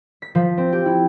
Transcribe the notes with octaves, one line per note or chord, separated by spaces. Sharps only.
B6
F3
C4
G4
E4